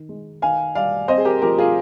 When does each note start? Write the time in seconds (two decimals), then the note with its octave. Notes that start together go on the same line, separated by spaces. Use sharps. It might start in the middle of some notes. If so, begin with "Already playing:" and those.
Already playing: D#3
0.09 G#3
0.42 D#3 F5 G#5
0.75 G3 D5 F5
1.08 C4 C5 D#5
1.18 G#4
1.25 G4 A#4
1.42 F3 G4 A#4
1.58 F4 G#4